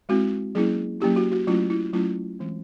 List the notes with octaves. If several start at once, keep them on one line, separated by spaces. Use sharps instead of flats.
G#3 C4 E4 F#4
F#3 A#3 C#4 E4 G#4
F#3 A#3 C#4 E4 G4
F#4
F#4
F#3 A3 C#4 E4 F4
E4
F#3 A3 C#4 E4 F4
E3 G#3 C4